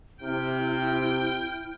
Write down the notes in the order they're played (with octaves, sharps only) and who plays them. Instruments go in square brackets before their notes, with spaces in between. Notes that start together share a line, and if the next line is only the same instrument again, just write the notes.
[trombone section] C3 [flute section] E4 F6 [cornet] G5